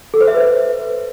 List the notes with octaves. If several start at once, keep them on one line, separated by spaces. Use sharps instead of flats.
A4
C5
E5
B4